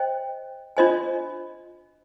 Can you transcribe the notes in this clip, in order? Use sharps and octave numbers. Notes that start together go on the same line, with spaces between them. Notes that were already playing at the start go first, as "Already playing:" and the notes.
Already playing: C5 D#5 G5
D4 F4 C5 D#5 G#5